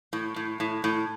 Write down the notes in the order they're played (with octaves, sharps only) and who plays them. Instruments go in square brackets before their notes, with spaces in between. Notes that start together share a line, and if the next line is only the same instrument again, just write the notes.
[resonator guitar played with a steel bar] A2
A2
A2
A2